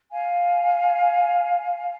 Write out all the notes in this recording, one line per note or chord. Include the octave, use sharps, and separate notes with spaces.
F5 G#5